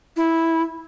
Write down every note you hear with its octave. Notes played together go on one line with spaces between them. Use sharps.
E4